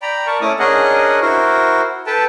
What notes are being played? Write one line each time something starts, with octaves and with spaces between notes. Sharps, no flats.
D5 G5 A#5 B5
A#4 D5 A5 C#6
A3 C#4 E4 D6 D#6
C#4 D4 G#4 A#4 D#5 F#5
E4 F#4 A#4 C5
A4 B4 G5 A5